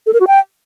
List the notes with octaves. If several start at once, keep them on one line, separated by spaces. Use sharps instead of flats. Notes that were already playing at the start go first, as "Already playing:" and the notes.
A4
A#4
F#4
G5